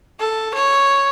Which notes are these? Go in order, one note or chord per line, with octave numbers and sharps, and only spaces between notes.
A4
C#5